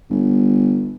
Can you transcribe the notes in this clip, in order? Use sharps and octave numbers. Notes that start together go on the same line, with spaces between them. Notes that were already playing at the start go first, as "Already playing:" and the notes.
G1